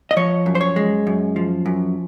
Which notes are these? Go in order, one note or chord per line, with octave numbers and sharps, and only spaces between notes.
D#5
F3 C#5
F#2
C5
C#5
G#3
F#2
F3
F#2